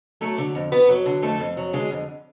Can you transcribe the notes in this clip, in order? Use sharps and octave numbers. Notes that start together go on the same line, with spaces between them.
F#3 A3 A4
D3
F2
F2 B3 B4
F#3
D3
F2 A3 A4
F2
F#3
D3 G#3 G#4
F2